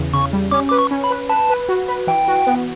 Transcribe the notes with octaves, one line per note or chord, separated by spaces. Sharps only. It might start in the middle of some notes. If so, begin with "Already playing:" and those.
Already playing: E2 C#3
C#3 C#6
G3
C#4 D6
B4 D6
C#6
C#4
B5
B4
B4 A5
B4
F#4
B4
E3 G5
F#4
B3